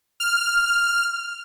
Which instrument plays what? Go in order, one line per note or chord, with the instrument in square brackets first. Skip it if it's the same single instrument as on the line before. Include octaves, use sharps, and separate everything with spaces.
[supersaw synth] F6